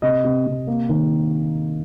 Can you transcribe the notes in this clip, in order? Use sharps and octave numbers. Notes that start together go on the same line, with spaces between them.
C3 D#5
C3
C3
A#3
D#3